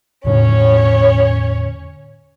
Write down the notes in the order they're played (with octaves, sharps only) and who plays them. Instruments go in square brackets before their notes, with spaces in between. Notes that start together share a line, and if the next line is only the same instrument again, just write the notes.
[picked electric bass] E1 A2 D3 [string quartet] C#4 C#5